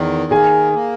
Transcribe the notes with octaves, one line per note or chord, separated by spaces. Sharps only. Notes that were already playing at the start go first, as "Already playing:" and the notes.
Already playing: E2 D#3
A#3 G#4 G#5
A#3